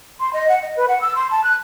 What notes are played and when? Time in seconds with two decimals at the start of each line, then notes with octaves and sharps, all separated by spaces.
0.20 C6
0.33 D#5
0.48 F#5
0.62 D#5
0.77 B4
0.88 F#5
1.01 E6
1.15 C6
1.31 A5
1.44 F#6